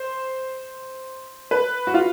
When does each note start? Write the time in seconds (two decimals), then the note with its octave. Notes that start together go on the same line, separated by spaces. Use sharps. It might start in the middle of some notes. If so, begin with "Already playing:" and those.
Already playing: C5
1.51 B4
1.87 F#4
1.94 F4